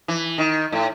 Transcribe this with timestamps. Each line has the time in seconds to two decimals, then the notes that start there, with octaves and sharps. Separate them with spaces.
0.08 E3
0.38 D#3
0.72 A2